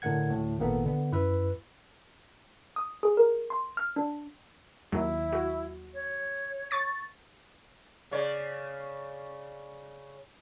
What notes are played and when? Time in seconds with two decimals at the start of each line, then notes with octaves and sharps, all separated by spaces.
0.02 A2 D3 A#4 F#5 G#6
0.30 D2 A2
0.58 G#1 A#2 D#3 A#3 B3 A4
0.84 D3 B3
1.12 F#2 E4 B4 E6
2.76 D#6
3.03 G#4
3.17 A#4
3.50 C6
3.77 F6
3.96 D4
4.92 D#2 F#3 E4
5.33 F#4
5.94 C#5
6.71 C#6 A6
8.11 C#3 C#5 D5